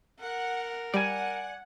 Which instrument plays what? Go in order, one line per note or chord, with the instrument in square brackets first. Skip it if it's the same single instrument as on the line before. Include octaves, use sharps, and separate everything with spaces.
[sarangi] A#4 [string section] F#5
[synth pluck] G3 [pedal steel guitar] D5 G#5 [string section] F#5